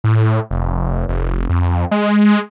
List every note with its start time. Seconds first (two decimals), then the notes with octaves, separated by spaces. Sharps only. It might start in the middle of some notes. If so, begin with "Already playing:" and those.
0.04 A2
0.51 F1
1.09 F1
1.49 F2
1.91 G#3